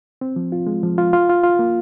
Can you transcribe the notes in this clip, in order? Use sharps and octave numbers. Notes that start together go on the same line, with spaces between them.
C4
F3
F4
G#3
F3
F4
F4
F4
F4
A#3